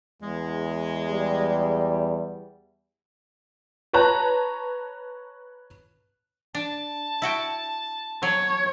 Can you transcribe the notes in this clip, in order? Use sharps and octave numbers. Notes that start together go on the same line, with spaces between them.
E2 G#3
G3
B4 C#5 A5 A#5 F#6
D4 A5
E4 F#4 G5
F#3 C#5